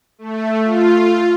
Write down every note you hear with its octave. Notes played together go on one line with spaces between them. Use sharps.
A3
F4